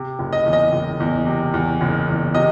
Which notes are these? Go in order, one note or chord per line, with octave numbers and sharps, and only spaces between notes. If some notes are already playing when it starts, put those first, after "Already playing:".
Already playing: C3
F#1
D#5
E2
D#5
F#1
E2
C3
E2
F#1
E2
C3 D#5